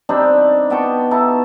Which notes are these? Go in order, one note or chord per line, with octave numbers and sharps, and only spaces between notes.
G3 C4 D4 D#4
B3 G5 A5 C#6
D#4 E4 A4 A5